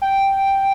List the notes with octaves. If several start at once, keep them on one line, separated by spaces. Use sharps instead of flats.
G5